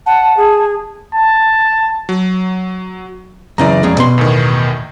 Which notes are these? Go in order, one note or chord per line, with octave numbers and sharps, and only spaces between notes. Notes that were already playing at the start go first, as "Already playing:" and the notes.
F#5 A5
G#4
A5
F#3
F#2 C#3 E3 D5 A#5
F2 C#3 G#3
B2 C6
E2 A2 D#3